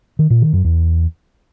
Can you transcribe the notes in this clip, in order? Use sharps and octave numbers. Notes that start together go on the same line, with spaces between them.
D#3
A#2
D#3
F#2
E2